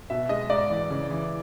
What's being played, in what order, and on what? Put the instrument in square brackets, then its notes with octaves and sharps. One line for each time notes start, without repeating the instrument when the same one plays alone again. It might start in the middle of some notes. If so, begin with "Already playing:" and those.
[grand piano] B2 E5
G#3 D#5
G#2 D5
E3
C#3
E3